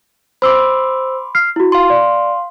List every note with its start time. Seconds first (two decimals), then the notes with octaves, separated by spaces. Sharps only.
0.42 C5 B5 C6 D6 E6
1.35 F6 C7
1.56 E4 F#4
1.72 F5 C6
1.90 D5